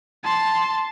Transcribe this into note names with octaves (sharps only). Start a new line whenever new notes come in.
A5 C6